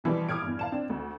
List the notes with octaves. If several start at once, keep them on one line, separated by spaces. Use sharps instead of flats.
B2 E3 F3 G3
D6 D#6 F6 G#6 D7
E2 G2
F5 A5 E7
C4 D4
D2